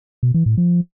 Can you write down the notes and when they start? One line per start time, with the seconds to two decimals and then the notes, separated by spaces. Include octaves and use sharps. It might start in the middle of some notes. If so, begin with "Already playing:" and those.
0.23 B2
0.34 E3
0.46 A2
0.57 F3